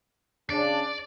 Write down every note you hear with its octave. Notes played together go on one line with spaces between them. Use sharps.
C#3 D4 D5